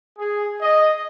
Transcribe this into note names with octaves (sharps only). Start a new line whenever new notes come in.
G#4
D#5